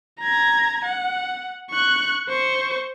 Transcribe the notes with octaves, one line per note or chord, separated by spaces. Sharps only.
A#5 G#6
F#5
C#6 F#6
C5 C#6